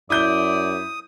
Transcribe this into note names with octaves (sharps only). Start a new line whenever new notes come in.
F#2 E4 D5 D#6 G6 G7